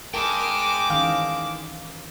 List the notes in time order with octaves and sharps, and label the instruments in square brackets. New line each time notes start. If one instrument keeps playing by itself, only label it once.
[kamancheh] G#3 D6 [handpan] A#4 [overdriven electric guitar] G5 A5
[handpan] D#3 E3 C#4 [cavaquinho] F5